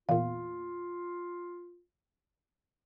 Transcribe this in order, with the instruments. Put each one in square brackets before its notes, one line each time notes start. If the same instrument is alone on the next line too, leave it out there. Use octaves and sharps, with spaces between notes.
[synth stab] E2 A#2 [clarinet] F4 [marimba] F5